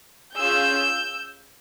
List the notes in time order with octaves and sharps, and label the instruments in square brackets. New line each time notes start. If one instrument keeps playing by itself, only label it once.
[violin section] C#4 F4 G#4 E6 G6